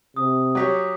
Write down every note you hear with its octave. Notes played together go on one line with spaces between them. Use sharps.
C3 D#6
F#3 G4 C#5 D6 B6